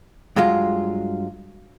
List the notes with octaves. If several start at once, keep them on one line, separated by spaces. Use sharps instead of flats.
G2 F#3 G#3 F4